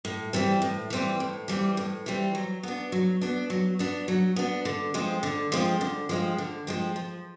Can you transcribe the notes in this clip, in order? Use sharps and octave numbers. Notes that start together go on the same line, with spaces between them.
A2
E3 G3 C4
A2
E3 G3 C4
A2
E3 G3 C4
A2
E3 G3 C4
F#3
B3 D4
F#3
B3 D4
F#3
B3 D4
F#3
B3 D4
D3
F3 G#3 C4
D3
F3 G#3 C4
D3
F3 G#3 C4
D3
F3 G#3 C4
F3